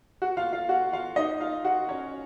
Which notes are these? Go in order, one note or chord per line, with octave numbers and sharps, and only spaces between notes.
F#4 F#5
F4 F5
F4 F5
F#4 F#5
F4 F5
D#4 D#5
F4 F5
F#4 F#5
C#4 C#5